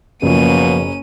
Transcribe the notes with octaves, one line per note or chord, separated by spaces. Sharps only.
F#1 B2 F3 A#3 C#4 D#7